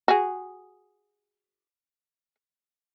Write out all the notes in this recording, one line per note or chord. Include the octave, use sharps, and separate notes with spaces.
F#4 G#4